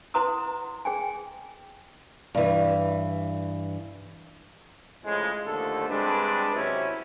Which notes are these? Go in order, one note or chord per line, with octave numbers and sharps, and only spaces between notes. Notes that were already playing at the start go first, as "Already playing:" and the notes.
E4 B4 F#5 A#5 C6 D#6
G#4 G5 G#5
G2 E3
A2 C#3 F3 G#3
D#2 D3 F3 A3 A4
G2 G#3 C4 D4 B4
C3 F#3 C4 C#4 E4